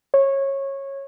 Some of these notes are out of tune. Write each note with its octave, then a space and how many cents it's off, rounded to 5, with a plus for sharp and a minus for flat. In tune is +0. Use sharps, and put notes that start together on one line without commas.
C#5 -20